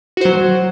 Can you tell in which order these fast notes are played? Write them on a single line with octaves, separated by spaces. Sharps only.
F#4 C5 F#3